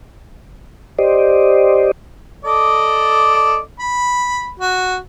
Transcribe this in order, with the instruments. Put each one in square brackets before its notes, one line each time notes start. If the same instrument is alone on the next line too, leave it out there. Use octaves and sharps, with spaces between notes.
[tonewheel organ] G4 C5 D5 D#5
[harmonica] A4 D5 D#5
B5
F#4